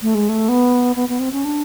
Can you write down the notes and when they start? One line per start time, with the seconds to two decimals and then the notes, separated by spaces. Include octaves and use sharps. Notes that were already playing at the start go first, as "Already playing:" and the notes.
0.02 A3
0.15 G#3
0.29 A3
0.49 B3
0.96 B3
1.09 B3
1.20 C4
1.32 C#4
1.44 D4